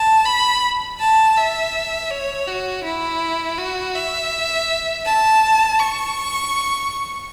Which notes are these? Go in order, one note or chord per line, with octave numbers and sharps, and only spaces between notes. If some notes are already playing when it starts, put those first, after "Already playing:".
Already playing: A5
B5
A5
E5
C#5
F#4
E4
F#4
E5
A5
C#6